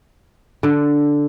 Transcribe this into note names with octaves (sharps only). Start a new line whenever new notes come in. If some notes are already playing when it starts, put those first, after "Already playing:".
D3